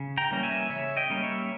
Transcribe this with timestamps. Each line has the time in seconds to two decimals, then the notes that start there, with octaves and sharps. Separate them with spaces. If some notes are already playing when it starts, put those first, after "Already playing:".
Already playing: C#3
0.17 G5 A#5
0.30 E3 G3 A#3 C#4
0.43 E5 G#5
0.70 C#3 C#5 E5
0.97 D#5 G5
1.10 G3 A#3 C#4
1.23 C#5 E5